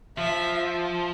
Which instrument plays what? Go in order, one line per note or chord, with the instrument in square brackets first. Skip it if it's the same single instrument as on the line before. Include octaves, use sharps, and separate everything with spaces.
[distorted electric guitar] F3 [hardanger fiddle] E5